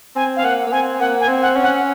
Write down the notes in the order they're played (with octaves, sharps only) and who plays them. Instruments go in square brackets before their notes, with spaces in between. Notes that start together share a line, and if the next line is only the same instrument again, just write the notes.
[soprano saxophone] C4 [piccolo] G#5
[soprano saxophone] C4 [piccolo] F5
[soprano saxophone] A#3 [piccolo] F#5
[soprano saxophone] A#3
[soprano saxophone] C4 [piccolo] G#5
[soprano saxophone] A#3 [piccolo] F#5
[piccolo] G#5
[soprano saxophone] C4
[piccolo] F#5
[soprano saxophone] C#4
[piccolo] F#5